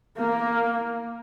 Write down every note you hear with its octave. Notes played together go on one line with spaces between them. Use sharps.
A#3